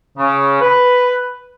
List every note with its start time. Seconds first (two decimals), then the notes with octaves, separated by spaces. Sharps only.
0.17 C#3
0.61 B4